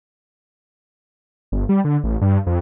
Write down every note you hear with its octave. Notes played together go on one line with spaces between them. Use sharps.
G1
G3
D3
A1
G2
F2